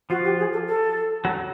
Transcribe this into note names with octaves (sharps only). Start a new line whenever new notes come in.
F3 F4 F#4
G4
G#4
A4
A4
F#3 F#4